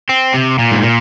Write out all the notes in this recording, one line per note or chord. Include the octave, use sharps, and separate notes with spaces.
C4
C3
A#2
G#2
A#2